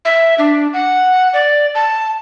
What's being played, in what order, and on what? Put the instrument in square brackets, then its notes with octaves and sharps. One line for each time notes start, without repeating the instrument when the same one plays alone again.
[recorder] E5
D4
F#5
D5
A5